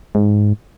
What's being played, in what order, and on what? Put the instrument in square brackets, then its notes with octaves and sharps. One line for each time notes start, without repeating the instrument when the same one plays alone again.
[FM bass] G#2